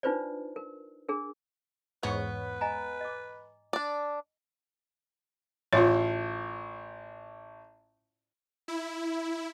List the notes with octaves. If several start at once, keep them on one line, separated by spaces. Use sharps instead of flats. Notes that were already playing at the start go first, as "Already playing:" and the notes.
D4 D#4 F4 B4 C5 D5
A#4
D4 G#4 A#4
E2 G#2 B3 B4 C#5
D#5 G#5 A#5
D#5 D6
D4 D5
A1 F4 C#5
E4